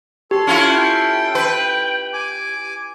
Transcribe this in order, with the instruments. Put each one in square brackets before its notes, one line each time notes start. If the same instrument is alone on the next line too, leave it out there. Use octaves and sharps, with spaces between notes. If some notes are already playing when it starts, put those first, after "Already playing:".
[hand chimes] G4 [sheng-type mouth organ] A4 C6
[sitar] C#4 E4 F4
[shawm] G5
[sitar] B4
[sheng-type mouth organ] G#5 D6